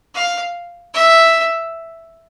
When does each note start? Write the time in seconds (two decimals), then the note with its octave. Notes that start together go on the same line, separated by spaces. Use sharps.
0.15 F5
0.94 E5